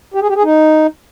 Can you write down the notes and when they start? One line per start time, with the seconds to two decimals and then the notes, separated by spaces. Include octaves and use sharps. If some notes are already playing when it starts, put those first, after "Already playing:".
0.14 G4
0.21 G#4
0.29 G4
0.36 G#4
0.43 D#4